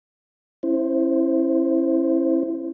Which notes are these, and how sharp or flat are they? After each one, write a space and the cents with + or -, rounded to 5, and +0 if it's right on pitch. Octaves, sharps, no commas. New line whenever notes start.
C#4 -40 E4 +5 C5 +0